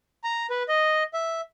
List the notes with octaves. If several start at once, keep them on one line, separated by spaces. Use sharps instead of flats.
A#5
B4
D#5
E5